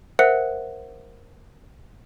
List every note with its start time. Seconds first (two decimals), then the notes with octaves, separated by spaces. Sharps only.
0.19 A#4 C5 E5 F#5 F#6 C#7